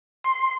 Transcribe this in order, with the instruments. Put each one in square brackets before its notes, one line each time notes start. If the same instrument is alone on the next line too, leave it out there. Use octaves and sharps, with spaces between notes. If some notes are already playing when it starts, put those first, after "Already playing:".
[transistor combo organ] C6